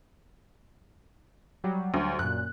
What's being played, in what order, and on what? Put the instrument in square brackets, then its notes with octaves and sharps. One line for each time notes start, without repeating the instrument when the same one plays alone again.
[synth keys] F#3 G3
[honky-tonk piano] D2
[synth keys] F#2 A#2 [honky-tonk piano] F#6